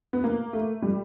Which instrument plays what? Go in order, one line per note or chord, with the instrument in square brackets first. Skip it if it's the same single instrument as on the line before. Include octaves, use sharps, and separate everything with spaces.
[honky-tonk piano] B3
A#3
A3
G3